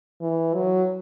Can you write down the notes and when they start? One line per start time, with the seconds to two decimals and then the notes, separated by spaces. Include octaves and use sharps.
0.21 E3
0.54 F#3